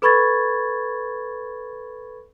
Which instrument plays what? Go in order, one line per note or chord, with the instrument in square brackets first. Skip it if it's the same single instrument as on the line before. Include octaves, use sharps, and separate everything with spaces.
[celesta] A4 B4 B5 C#6 G#6 A6